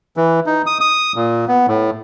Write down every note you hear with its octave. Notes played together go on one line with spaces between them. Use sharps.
E3
D#4
D#6
D#6
A#2
B3
A2